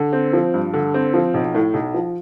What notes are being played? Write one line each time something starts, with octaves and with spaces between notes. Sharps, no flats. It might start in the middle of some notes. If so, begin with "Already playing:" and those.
Already playing: D3
C4
F3
G2
D3
C4
F3
B1
A2
B1
F3